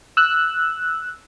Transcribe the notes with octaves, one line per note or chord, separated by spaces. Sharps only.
E6 F#6